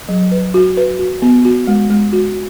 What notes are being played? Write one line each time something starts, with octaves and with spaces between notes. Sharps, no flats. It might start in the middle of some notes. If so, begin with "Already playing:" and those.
F#3
B4
F#4
B4
F#4
B3
F#4
G#3
G#3
F#4